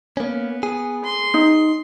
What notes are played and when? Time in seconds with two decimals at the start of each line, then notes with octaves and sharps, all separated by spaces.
0.17 A#3 B3 C#4
0.63 G#4
1.04 C6
1.34 D#4